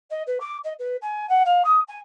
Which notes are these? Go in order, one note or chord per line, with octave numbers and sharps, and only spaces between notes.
D#5
B4
D6
D#5
B4
G#5
F#5
F5
D#6
G#5